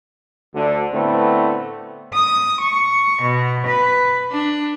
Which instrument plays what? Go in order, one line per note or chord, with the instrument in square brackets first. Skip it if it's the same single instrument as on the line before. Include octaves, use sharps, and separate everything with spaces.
[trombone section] D2 D3
A2 D3 A3 B3 C4
[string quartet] D#6
C#6
B2
B4
D4